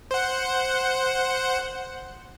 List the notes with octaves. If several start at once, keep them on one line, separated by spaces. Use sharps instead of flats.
C5 F#5